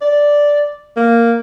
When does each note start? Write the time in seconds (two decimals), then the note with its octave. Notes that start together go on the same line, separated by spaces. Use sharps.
0.01 D5
0.97 A#3